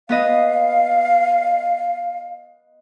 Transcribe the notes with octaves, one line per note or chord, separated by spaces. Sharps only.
B3 B4 D#5 F5